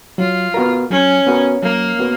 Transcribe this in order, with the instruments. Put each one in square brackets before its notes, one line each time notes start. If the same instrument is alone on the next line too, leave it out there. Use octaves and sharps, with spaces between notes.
[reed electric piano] F#3 [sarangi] F4
[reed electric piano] B3 F#4 A#4
[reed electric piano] F#3 [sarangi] C#4
[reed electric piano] B3 F#4 A#4
[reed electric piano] F#3 [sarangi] A#3
[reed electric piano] B3 F#4 A#4